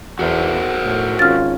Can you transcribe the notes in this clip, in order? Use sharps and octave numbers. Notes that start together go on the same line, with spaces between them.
E2 F#4 A#4 C5
A2
G#1 C#4 F4 F6 A6